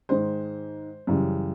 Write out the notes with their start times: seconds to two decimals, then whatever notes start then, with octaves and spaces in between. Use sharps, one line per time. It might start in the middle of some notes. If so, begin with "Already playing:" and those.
0.09 G#2 D#3 G#3 C5
1.07 F#2 C#3 E3 G3